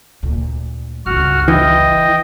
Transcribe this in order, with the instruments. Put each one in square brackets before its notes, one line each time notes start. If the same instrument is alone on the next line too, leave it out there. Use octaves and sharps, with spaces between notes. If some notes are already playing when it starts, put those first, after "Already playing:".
[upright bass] D2 A#2
[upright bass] G1 C#2 [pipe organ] F#4 F6
[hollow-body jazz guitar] E3 [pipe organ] D#5 G5